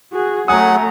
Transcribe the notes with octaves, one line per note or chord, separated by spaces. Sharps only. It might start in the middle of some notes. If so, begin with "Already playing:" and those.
F#4 G#4
F#3 A3 F#5 G#5 A#5 D#6